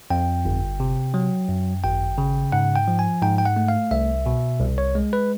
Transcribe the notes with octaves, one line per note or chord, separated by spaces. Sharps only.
F2 G5
G1
C3
F#3
F#2
G#1 G5
C#3
G#2 F#5
G5
F3
G#5
G#2 G5
G5
F#5
A3
F5
C2 E5
B2
C2
C#5
G#3
B4